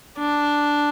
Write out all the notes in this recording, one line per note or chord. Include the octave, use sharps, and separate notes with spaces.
D4